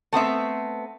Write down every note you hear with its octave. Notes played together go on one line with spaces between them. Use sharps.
A3 B3 C4 E5